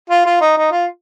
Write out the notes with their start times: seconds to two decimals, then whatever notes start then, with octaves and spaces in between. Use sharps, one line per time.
0.10 F4
0.26 F4
0.41 D#4
0.57 D#4
0.72 F4